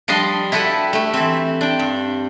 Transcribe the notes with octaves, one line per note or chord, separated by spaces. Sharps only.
F3 G3 D4 D#5 C6
E4 F#4 G4 A4 B4
A3 G4
E3 C4
D4 G5
G2